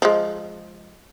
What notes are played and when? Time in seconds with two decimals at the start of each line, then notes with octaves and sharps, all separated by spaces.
0.02 F3 G#3